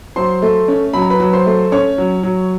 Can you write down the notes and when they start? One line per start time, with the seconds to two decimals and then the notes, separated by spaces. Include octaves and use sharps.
0.16 F#3 C5 C6
0.42 A3
0.68 C#4
0.93 F#3 B5
1.02 A#5
1.10 B4 B5
1.20 F#3
1.33 C5 C6
1.46 A3
1.72 C#4 C#5 C#6
1.98 F#3
2.23 F#3